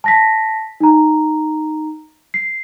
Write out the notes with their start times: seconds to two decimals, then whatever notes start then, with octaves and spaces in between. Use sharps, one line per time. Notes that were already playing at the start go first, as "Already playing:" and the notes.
0.04 A5 A#6 B6
0.80 D#4 A#5
2.34 C7